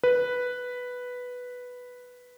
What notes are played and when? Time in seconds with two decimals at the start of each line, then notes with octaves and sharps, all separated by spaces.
0.03 B4